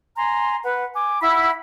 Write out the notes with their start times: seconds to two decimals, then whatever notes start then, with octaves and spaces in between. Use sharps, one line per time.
0.16 G#5 A#5 C6
0.64 B4 F#5
0.94 G#5 D6
1.22 E4 F#5 B5 E6